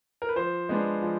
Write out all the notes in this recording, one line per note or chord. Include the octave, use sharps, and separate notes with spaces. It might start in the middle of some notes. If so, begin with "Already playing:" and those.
A#4
B4
F3 C5
G#3 B3 D4
F3